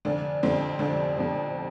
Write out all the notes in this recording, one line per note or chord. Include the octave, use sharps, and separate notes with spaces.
F1 D3 D4
F2 D3 G3 C4
F1 D3 D4
F2 D3 G3